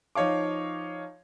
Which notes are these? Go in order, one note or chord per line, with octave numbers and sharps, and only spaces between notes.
F3 D#4 C#5 F5 D6